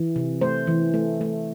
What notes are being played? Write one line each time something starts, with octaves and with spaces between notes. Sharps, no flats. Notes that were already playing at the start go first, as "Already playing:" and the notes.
Already playing: E3
C3
A3 C5
E3
A3
A3